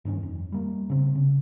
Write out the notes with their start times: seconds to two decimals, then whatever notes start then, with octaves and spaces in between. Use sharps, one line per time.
0.05 G2 D#3 B3 C#4
0.23 F2
0.52 G3 A#3
0.90 C#3 C4
1.15 C#3